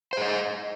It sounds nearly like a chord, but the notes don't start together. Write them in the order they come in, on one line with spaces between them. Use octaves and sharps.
C5 G#4 D#5